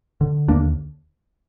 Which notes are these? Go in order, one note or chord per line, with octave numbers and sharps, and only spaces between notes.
D3
D#2 A#3 D4